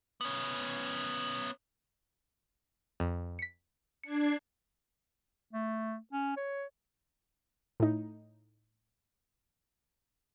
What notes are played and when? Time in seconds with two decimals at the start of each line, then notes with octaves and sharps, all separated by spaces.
0.21 B3 C#4
3.00 F2
3.39 B6 C#7
4.03 D4 G#6 C7 C#7
5.53 A3
6.12 C#4
6.37 C#5
7.80 A2 D#4